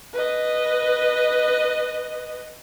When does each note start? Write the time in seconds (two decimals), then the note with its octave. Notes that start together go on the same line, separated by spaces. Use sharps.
0.13 B4 D#5